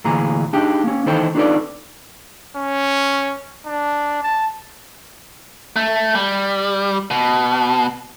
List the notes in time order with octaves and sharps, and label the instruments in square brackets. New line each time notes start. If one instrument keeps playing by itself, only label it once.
[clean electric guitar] D2 A#2 E3 G#4 A#5
D4 D#4 G4 G#4
A#3 C#4
D#3 E3 A4 C5 G5 C6
D4 D#4 F4 A4 B4 D5
[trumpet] C#4
D4
A5
[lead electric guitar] A3
G3
B2